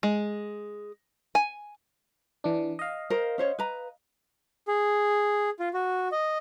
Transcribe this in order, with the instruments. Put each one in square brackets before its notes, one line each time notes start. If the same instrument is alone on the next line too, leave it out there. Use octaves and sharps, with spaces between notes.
[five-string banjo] G#3
G#5
[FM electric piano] E3 D4
D#5 F5
[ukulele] A#4 C5
C#4 C5 C#5
B4 A#5
[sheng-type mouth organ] G#4
F4
F#4
D#5